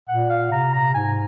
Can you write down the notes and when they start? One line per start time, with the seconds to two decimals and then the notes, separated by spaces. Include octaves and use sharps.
0.09 A#2 F#5
0.30 F5
0.52 C3 A#5
0.73 A#5
0.94 G#2 G#5